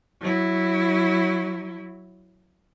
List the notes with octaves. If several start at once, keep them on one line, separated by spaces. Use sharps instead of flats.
F#3 E4